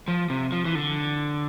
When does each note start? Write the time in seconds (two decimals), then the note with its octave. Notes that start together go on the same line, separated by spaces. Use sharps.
0.08 F3
0.30 C3
0.52 F3
0.65 E3
0.75 D3